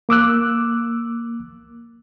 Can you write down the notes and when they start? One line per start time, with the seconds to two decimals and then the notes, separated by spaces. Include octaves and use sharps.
0.09 A#3 D6 E6 F#6